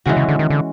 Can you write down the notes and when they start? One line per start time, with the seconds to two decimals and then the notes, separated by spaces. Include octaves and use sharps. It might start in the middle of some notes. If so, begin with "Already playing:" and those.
0.06 C#3 E3 G#3 C#4 F#4
0.17 C#3
0.28 D3
0.39 D#3
0.50 D3